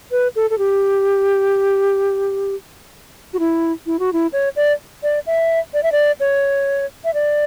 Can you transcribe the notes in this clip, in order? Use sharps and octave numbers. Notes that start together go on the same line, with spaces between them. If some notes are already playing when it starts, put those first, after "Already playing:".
B4
A4
A4
G4
F#4
E4
E4
F#4
E4
C#5
D5
D5
E5
D5
E5
D5
C#5
E5
D5